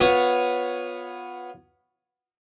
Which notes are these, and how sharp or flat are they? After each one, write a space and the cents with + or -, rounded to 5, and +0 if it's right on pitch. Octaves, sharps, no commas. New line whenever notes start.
B3 +0 F4 +20 C#5 +0